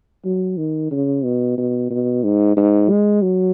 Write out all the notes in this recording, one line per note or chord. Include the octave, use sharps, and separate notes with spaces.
F#3
D#3
C#3
B2
B2
B2
G#2
G#2
G#3
F#3